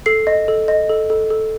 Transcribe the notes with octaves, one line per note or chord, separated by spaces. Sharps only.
A4 C7
D#5
A4
D#5
A4
A4
A4